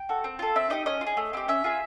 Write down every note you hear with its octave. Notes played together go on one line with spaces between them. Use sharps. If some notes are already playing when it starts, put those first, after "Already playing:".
Already playing: G5
F#4 A4
C4
F4 A4
C4 E5
D#4 G4 D#5
C#4 D#5
F4
G#4
A3
C4 E4 G4
C#4 E5
F4 G#4